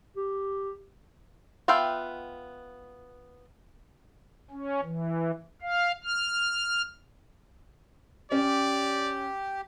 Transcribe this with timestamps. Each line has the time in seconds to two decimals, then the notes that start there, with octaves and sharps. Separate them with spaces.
0.16 G4
1.68 B3 F4 E5 F5 G5
4.51 C#4
4.83 E3
5.62 F5
6.03 F6
8.32 C#4 G4 D5